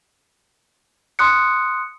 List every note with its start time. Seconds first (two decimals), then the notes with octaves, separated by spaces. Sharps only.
1.19 C6 D#6 F#6 C#7